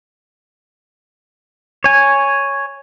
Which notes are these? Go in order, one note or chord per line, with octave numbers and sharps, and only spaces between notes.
C#5 G#5